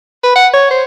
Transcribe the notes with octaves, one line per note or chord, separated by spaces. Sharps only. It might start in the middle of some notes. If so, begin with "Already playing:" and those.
B4
F#5
C#5
C5